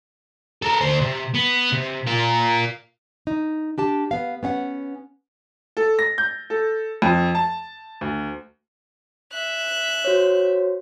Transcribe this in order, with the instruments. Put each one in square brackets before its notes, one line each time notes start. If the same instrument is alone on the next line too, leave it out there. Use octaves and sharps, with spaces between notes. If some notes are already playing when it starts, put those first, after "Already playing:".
[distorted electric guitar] A4 A#4
D2 C5
C3
B3
C3
F4 A#4
[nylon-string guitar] D#4
D4 G4 A5
B3 F5
B3 C#4 F5 F#5
[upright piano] A4
A#6
G6
A4
F2
A5
D2
[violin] E5 F#6
[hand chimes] F#4 C5 C#5